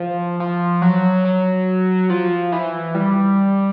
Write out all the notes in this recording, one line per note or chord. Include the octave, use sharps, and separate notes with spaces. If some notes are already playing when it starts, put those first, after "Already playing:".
Already playing: F3
F3
F#3
F#3
F3
E3
G3